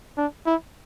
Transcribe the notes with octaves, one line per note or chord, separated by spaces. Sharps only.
D4
E4